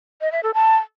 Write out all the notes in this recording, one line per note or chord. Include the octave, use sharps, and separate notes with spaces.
D#5
E5
A4
A5